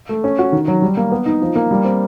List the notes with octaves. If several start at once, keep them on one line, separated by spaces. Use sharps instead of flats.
A3
C#4
F#4
D#3
F#3
G3
A#3
B3
D#4
F3
A#3
G3
C4